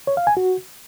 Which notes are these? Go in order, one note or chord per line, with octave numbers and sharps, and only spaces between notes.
C#5
F5
G#5
F#4